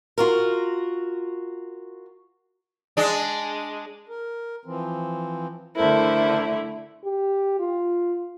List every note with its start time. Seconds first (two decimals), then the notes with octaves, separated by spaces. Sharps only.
0.18 F4 F#4 A#4
2.97 G#3 D4
4.09 A#4
4.66 E3 F3 C4
5.77 D3 A3 E4 A4 A#4 C5
7.04 G4
7.59 F4